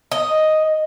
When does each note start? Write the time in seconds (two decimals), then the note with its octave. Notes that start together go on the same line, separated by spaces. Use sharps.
0.12 D#5